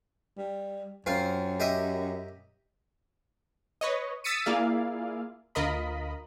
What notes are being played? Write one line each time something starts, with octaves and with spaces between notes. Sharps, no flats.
G3
F#2 C4 F4
G4 D#5 E5
B4 C#5 D#5
D#6 E6 A6 B6 C#7 D#7
A#3 E4 F4 G#4 D5 F5
D2 F4 A#4 D#5 B5